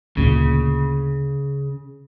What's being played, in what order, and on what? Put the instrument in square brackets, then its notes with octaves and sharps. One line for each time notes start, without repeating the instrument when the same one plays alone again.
[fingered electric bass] D2 A#2 [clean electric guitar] C#3